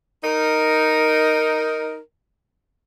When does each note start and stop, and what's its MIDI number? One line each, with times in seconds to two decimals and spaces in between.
0.23 1.99 63
0.23 1.99 70